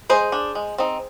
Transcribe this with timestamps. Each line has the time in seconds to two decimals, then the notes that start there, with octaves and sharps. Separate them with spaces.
0.09 G#3 G#4 C5
0.32 D4
0.55 G#3
0.78 C4 D#4